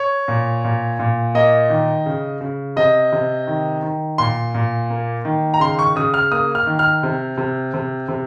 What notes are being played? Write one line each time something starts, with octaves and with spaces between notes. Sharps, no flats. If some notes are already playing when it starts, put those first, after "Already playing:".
Already playing: C#5
A#2
A#2
A#2
A#3 D#5
D#3
C#3
C#3
C3 D#5
C3
D#3
D#3
A#2 C6
A#2
A#3
D#3
A#5
C#3 C6
C#6
C#3 D#6
F6
A#3 D#6
F6
D#3
F6
C3
C3
C3
C3